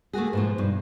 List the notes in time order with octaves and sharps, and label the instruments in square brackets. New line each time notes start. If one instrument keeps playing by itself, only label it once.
[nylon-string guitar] A3 A#3 F#4 G#4
G#2 B2 F3
G2 B2